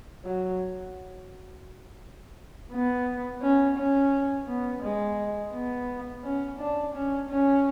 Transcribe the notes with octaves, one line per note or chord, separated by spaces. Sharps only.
F#3
B3
C#4
C#4
B3
G#3
B3
C#4
D4
C#4
C#4